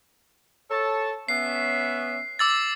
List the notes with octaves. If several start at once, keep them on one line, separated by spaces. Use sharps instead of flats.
A4 C#5 A5
B3 C#4 E5 C7
D6 E6 A6